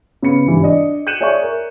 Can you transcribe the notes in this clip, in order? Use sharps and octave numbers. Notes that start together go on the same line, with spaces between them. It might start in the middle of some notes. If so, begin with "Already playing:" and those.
C#3 B3 C#7
G#1 G2 E3
D4 D5 D#5
F#6 G6 C#7 D#7 E7 F#7
G#4 C#5 D5 E5 G#5 C#6
A#4